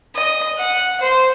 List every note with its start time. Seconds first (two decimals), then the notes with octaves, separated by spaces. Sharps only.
0.15 D#5
0.58 F#5
1.00 C5